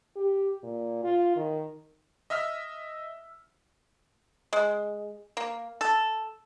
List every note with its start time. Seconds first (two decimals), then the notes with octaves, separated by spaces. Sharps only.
0.16 G4
0.63 A#2
1.04 F4
1.36 D#3
2.30 D#5 E5 E6 F6 B6
4.53 G#3
5.37 A#3
5.81 A4